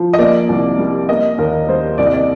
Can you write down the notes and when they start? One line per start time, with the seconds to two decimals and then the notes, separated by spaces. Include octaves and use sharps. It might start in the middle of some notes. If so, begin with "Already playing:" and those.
Already playing: F3
0.13 D#5
0.19 A#3 D5
0.49 C2
0.78 G3
1.09 A#3 D#5
1.38 D#2 A#4
1.68 G3 C5
1.98 C2 D5
2.06 D#5
2.13 D5